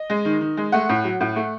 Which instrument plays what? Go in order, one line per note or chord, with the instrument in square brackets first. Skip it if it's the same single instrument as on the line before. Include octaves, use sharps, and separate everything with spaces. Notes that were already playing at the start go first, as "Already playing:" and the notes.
Already playing: [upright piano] D#5
G#3
D#3
D#3
G#3
A3 F#5
A2
F#3
A2 F#5
A3